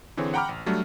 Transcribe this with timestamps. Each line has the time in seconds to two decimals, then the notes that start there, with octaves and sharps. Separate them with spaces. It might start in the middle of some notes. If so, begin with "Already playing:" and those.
0.17 D3 E3 C4 G#4 C#5
0.34 F#5 G5 A#5 B5 D6 F6
0.49 A1
0.66 F#3 G3 A3 D4